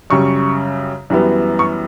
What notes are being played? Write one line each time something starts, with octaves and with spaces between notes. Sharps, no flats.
F#2 C#3 G3 C#6
F#2 E3 G3 B3
C#6